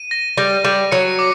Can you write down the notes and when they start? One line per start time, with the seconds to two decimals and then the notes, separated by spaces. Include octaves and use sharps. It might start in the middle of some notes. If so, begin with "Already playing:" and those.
Already playing: D#7
0.11 A#6
0.38 G3 A#6
0.65 G3 D#7
0.92 F#3 C#7
1.19 D6